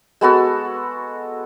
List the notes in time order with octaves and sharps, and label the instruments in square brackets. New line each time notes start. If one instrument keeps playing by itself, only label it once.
[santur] G#3 B3 F#4 A4